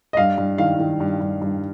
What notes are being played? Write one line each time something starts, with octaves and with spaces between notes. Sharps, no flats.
D#5
G2 F5
G2
D#3 F5
D#3
G2
G2
G2